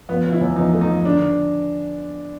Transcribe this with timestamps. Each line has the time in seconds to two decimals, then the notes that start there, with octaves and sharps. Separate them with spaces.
0.09 F3 B3
0.24 F3
0.32 E4
0.41 E2
0.56 F3 D#4
0.73 A3
0.81 D#4
0.89 F3
1.05 D3 D4
1.21 D3